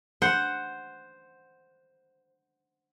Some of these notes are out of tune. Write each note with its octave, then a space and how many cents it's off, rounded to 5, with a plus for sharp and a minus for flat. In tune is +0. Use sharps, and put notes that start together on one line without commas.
C5 +0 F#5 +0